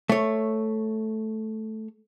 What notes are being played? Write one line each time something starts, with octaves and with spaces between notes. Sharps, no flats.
A3 C#5